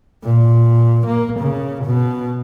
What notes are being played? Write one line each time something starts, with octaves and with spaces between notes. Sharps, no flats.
A#2
A#3
C#3
B2